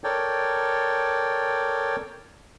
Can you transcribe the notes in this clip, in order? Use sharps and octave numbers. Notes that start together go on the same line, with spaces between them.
A4 A#4 C#5 D5 G5